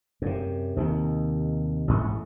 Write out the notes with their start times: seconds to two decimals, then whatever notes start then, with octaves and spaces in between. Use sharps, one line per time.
0.22 F#2 C3
0.77 D#2 C3 D#3
1.88 A1 G#2 A3